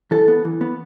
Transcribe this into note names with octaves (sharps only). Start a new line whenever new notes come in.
E3 A4
B3
E3
B3